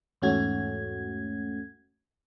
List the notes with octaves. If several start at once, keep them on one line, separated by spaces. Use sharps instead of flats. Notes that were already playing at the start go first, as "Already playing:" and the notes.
E2 G#2 A3 C#4 F#4 G#6